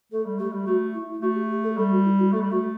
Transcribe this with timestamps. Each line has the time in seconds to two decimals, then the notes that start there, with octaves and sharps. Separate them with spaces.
0.12 A3 A4
0.25 G3
0.39 A3 G4
0.53 G3
0.66 A3 F#4
0.94 E4
1.21 A3 F#4
1.36 G4
1.50 G4
1.64 A4
1.77 G3 A4
1.91 F#4
2.05 E4
2.19 F#4
2.32 A3 A4
2.41 G3
2.50 A3 F#4